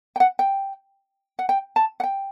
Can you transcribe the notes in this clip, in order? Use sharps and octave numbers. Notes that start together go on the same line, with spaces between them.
G5
F#5
G5
F#5
G5
A5
F#5
G5